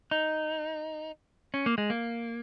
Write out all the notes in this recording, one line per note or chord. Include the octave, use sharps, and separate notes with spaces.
D#4
C#4
A#3
G#3
A#3